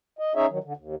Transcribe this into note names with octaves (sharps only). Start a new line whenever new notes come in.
D#5
C#4 D#4 G#4 C#5 E5
D#3 F#3
D3
D#2